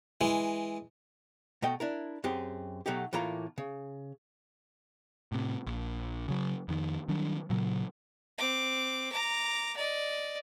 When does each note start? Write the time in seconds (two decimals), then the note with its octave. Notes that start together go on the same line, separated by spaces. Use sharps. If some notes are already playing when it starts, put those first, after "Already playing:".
0.21 E3 G#3
1.62 B2 A3 D#5 G5
1.80 D4 E4 A#4
2.24 F#2 C4 G4 G#4
2.86 B2 F#3 A3 D#4 G4
3.13 A2 E3 A#3 F4 A#5
3.58 C#3
5.32 A2 C3
5.67 A#1
6.28 C#3 F#3
6.68 F2 D#3
7.09 D#3 F#3 G3 D4
7.50 A#2 C#3 F#3
8.38 C4 D6
9.12 A#5 D6
9.77 D5 D#5